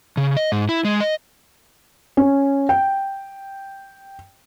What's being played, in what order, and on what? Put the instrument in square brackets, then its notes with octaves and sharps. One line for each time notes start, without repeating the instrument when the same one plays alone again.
[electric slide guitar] C#3
D#5
G#2
E4
G#3
D#5
[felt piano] C#4
G5